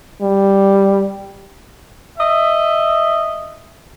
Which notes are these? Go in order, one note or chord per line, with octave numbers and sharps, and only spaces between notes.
G3
D#5 E5